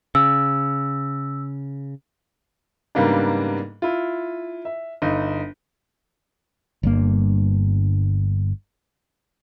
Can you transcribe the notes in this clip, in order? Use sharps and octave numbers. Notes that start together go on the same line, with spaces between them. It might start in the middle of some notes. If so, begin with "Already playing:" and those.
C#3 E6
G#2 C#3 G3 A#3 B3 D4
E4 F4
E5
G1 D#4
G1 G2 A#3